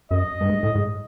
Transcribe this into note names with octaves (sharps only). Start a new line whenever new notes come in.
F#2 D#5
G2
G#2
A2
G#2